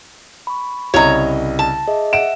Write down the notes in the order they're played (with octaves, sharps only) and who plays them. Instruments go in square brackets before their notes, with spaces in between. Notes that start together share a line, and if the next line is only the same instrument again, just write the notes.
[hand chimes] B5 C#6
[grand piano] C2 C#3 D#5 [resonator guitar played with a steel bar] C#5 A#5
[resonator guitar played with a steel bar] A5
[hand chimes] G#4 D#5 E5
[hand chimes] E5 [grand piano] F#5 D7 E7